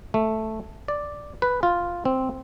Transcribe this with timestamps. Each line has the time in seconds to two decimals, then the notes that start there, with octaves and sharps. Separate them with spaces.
0.14 A3
0.88 D5
1.42 B4
1.63 F4
2.05 C4